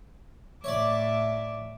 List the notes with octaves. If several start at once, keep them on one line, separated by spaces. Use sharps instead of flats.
A2 C#5 D5 E5 D6